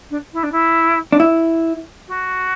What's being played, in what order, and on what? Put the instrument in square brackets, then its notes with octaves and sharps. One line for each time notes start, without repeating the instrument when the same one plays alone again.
[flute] D4
E4
D4
E4
[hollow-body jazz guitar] D4
E4
[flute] F#4